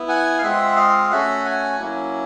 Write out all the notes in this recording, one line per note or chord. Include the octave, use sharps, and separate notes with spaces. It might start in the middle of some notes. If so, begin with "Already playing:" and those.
Already playing: B3 E4
F#5 G#5
F5
G#3 C4 F4 E5 F#5
D#5 F5
A3 C#4 F#4 E5 F#5
F#5 G#5
F#3 A#3 C#4 E4